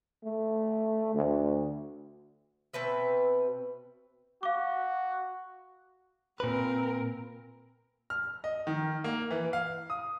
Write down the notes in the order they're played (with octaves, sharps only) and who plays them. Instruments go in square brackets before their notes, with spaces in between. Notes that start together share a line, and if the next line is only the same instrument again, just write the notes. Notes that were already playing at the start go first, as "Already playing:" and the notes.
[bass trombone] A3
D2
[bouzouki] B2 C4 B4 E5
[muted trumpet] F#4 [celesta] F5 D6
[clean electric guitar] A#2 B4 [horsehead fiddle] C4 A#4
[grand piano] F6
D#5
D#3
A#3
E3
F5
D#6